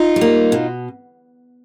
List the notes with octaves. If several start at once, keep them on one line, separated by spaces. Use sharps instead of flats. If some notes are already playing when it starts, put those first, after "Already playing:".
Already playing: D#4 F4
G3
A#3
B2